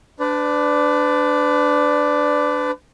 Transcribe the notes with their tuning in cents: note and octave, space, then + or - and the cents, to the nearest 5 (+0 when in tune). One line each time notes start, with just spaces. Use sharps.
D4 +0 B4 +35 D5 +0